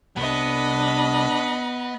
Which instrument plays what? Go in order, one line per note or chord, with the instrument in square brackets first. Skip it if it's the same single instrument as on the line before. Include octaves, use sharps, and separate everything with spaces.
[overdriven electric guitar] C2 [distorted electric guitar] B3 [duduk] D4 [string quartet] D#5 B5